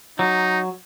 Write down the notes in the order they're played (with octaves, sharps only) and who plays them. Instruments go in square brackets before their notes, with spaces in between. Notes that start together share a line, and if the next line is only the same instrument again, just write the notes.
[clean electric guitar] F#3 [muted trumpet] D#4